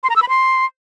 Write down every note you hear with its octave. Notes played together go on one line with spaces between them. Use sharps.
C6
A#5
E6
B5
C6